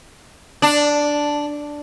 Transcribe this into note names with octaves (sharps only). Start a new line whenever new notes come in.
D4